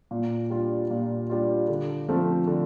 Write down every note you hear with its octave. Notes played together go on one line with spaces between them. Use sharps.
A#2
G3 D4 F4
A#2
G3 D4 F4
D3
F3 A3 C4
D3